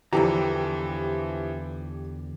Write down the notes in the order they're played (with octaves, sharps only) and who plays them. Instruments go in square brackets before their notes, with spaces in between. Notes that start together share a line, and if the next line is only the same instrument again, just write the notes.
[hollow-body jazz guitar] E2 D3 A#5 [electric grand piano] E3 F3 [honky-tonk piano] G4